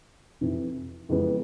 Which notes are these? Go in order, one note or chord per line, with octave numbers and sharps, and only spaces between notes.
F2 C3 E3
F2 C#3 E3 G#3 B3